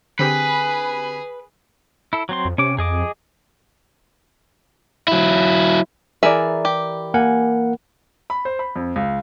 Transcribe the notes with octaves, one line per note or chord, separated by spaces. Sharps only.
D3 C4 G4 G#4 B4 G#5
E4 A4
F#3 C4 C6
F2
C3 C#4 D6
F2 G#4 D#5 D6
F#3 E4
E3 E4 G#4 A#4 D5 E5
G4
A#3 A#4 F#5 G#5
B5
C5
B5
F2
C#2